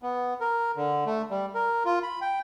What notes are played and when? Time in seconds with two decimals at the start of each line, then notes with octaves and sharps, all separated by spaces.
0.03 B3
0.41 A#4
0.76 D3
1.06 A3
1.31 G3
1.55 A#4
1.85 F4
2.03 B5
2.21 G5